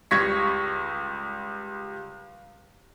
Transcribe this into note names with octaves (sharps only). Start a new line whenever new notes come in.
C#2 G3 C#6 G#6 A#6 B6